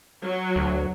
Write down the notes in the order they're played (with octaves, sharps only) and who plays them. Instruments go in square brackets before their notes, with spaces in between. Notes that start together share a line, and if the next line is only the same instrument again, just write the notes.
[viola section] F#3
[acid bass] D2